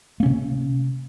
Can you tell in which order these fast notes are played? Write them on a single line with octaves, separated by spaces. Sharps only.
A#3 C#4 C3